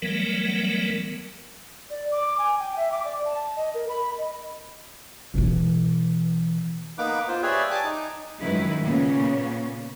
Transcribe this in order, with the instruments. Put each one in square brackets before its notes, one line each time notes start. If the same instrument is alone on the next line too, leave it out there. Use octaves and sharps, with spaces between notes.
[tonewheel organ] E3 F#3 G3 A3 B3 A#4
[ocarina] D5
D6
G#5
G5
E5
D6
D5
A5
D#5
A#4
B5
D#5
[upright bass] B2 E3
[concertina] A#3 B3 D#4 B4 D6
F4 C5
G4 G#4 B4 C#5 D5 E5
G#5 A5 D6
D#4
[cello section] F#2 D#3 F3 G#3 E4 B4
A#2 C#3 A#3 B3 C#4